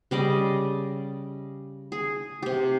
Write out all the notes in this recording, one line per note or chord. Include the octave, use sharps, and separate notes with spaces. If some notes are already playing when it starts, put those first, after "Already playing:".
C#3 G3 D5 D#5
G#4
C3 G4